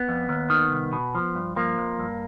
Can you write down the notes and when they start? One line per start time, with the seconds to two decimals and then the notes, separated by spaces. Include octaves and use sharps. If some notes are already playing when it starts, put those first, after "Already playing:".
Already playing: B3
0.09 F2
0.29 D#2
0.50 D#3
0.71 C2
0.93 B2
1.15 F3
1.35 G2
1.56 F3 A#3
1.78 F2
1.99 G2